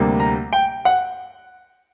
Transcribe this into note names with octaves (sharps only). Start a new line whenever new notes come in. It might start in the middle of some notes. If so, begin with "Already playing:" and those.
Already playing: D2 C3 G3 A#3
A#5
G5
F#5